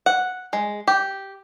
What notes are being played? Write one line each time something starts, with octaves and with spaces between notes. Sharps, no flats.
F#5
G#3
G4